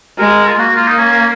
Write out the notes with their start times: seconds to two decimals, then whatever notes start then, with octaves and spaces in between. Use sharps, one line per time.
0.18 G#3 A#4
0.48 F4
0.58 A#3 F#4
0.76 F4
0.87 D#4
0.98 C#4